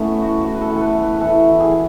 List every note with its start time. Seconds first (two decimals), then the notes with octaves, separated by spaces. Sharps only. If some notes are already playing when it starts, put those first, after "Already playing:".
Already playing: E3 A3 B3 C#4
0.15 A2
0.21 F#4
0.41 A2 F#4
0.55 B4
0.61 A4
0.67 E3
0.76 A4 B4
0.95 E3
1.01 B4
1.16 E3 A4 B4
1.48 E3
1.60 G#4